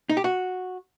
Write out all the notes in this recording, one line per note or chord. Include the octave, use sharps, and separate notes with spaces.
D#4
G4
F#4